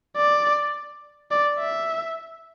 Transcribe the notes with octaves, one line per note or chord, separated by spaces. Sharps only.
D5
D5
E5